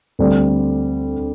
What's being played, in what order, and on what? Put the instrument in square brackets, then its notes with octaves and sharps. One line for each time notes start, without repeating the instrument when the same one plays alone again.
[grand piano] D2 D3 G3 C4